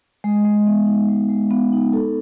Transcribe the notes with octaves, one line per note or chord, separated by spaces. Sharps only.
G#3
G#3
B3
D#4
G#3
G#3
B3
D#4
A4